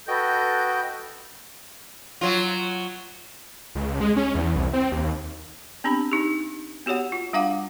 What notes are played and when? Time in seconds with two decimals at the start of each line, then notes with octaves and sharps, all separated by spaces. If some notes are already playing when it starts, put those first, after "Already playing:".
0.08 F#4 A4 B4 D#5 G5 G6
2.21 F#3 F4
3.75 C#2
4.01 G#3
4.16 C#4
4.35 E2
4.55 C2
4.73 C4
4.92 D#2
5.84 B3 C4 D4 G4 B5
6.12 D#4 G4
6.86 B3 F#4 G4 C#5 F#5
7.12 F4
7.33 G3 D4 F5 F#5 D6